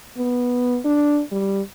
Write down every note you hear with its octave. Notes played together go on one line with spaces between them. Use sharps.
B3
D4
G3